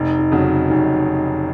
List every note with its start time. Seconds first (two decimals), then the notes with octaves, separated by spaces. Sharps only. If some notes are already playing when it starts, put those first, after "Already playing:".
Already playing: F1 D#4
0.19 D#4
0.32 F2 C#3 F#3
0.45 C#4
0.70 F1 D#4